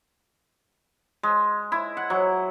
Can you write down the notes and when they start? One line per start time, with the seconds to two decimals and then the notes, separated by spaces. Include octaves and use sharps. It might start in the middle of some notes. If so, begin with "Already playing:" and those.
1.23 G#3
1.72 E4
1.97 F#5
2.10 F#3